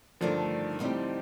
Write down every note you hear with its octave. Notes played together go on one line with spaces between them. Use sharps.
G2 D3 D#3 F3 A3 D4 A4
A2 G3 C4 D#4 G4